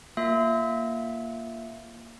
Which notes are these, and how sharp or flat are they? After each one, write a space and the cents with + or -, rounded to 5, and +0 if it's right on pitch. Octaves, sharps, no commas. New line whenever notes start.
A#3 +0 F4 -5 E5 +0